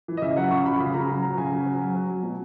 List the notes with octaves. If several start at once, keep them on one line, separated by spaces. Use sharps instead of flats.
E3
D#5
C#3 E5
F#3 F#5
C#3 C#6
C#3 B5
C#3 B5
C#3 A#5
F#3
F#3 A#5
C#3 G#5
F#3
F#3
F#3
F#3
F#3
B2